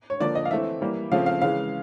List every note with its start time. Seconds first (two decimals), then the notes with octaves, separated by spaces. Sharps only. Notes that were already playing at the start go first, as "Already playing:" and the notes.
0.10 C#5
0.20 D3 F3 A#3 D5
0.35 D#5
0.45 F5
0.51 E3 A3 C4 E5
0.81 E3 G3 A#3
1.11 C#3 F3 A3 C4 F5
1.26 F5
1.42 C#3 E3 G#3 F5